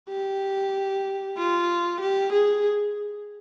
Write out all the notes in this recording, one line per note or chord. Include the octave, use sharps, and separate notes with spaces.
G4
F4
G4
G#4